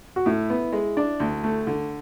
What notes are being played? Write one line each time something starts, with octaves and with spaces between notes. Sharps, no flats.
F#4
A2 E4
B3
G#3
D4
D2
A3
D3